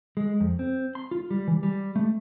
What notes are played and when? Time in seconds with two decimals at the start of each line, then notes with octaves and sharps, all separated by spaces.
0.17 G#3
0.40 F2
0.59 C4
0.95 C6
1.11 F4
1.31 G3
1.48 E3
1.63 G3
1.96 A3